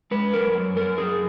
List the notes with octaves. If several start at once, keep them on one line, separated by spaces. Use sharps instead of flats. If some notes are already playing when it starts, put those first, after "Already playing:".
G#3 B4
F#2 A#4
F#2
F#2 A#4
F#2 G#4